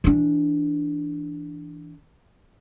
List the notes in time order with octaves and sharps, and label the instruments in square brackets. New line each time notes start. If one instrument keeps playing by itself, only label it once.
[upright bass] E3 D4